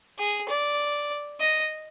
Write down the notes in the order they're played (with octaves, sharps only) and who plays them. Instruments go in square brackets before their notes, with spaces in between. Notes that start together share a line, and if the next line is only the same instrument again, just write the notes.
[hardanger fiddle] G#4
D5
D#5